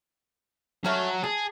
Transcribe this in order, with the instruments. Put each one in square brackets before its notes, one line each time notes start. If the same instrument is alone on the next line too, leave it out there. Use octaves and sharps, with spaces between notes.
[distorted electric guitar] F#3 F#4 [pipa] A3 C#4 A4
[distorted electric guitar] G#4 [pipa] A5